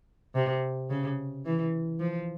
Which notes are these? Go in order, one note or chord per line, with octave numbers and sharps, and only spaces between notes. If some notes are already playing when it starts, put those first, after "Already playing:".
C3
C#3
E3
F3